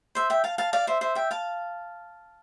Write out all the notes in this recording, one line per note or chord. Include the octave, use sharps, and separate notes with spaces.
C5 E5
E5 G5
F5 A5
F5 A5
D5 F5
C5 E5
C5 E5
E5 G5
F5 A5